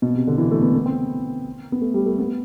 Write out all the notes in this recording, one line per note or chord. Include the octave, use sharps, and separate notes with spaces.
B2
C3
D3
E3
A3
B3
B3
C4
B3
A3
G3
A3
B3